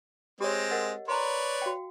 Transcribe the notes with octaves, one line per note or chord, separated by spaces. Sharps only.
G#3 C4 G4 C#5
A#4 D#5 F#5
B4 C#5 D5 A#5 C6
F#4 F5 G5